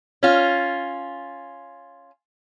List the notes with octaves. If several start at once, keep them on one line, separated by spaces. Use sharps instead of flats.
C#4 F4